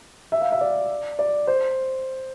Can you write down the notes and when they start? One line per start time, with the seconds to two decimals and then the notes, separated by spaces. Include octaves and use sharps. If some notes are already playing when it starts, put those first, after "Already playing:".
0.32 E5
0.41 F5
0.52 E5
0.61 D5
1.19 D5
1.47 C5